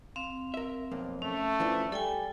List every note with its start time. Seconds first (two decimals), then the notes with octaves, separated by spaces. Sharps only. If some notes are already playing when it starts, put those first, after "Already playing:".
0.16 C4 F5
0.54 A#4 E5
0.92 B1 F2 A#3
1.22 A3 C#4
1.60 E3 F3 D4
1.92 G3 A4 G5 G#5